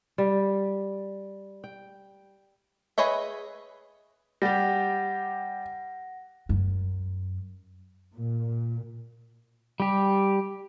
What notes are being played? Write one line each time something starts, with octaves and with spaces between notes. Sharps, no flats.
G3
G5
G#4 B4 C#5 D#5 E5
G3 G4 F#5 A#6
F#2
A#2
G3 G4